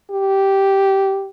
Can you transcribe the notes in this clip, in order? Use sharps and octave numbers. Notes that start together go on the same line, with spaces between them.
G4